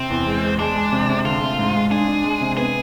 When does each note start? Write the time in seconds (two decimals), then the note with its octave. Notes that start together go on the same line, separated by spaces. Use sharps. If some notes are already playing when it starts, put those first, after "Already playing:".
Already playing: C3 C4
0.10 E2
0.26 G#3
0.43 G#3
0.59 G#3 D4
0.76 G#3
0.92 C3
1.09 C3
1.25 D3 F4
1.41 A3
1.59 G#2
1.75 G#3
1.91 D4 G#4
2.08 D4
2.24 G#3
2.41 C3
2.57 B3 G#4